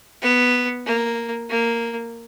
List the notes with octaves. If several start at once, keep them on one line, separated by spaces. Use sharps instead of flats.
B3
A#3
A#3